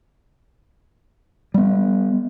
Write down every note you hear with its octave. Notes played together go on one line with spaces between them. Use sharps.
G3 B3